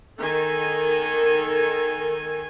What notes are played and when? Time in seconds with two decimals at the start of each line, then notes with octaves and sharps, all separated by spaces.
0.18 D#3 A4 G#5